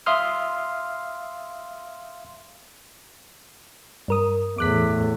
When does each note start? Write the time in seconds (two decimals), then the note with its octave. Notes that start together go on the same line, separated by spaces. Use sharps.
0.06 E5 F5 C6 D#6 F6
4.08 G2 A#4 D#6
4.58 E2 A2 D6 F#6 B6